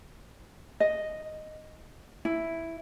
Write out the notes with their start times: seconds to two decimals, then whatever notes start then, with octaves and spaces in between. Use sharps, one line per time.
0.80 D#5
2.25 E4